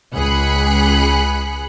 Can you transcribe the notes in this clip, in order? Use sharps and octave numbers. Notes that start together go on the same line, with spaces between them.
C#2 G#4 B5 F#6 C#7